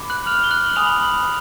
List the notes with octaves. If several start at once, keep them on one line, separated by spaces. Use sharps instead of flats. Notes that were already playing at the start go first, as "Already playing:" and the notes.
Already playing: B5 D6
F#6 F#7
F6 F7
G7
F#6 F#7
G#5 B5 D#6 F7
F#7